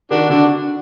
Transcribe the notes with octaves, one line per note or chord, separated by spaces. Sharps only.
D#3 D4 F#4
D3 D4 F#4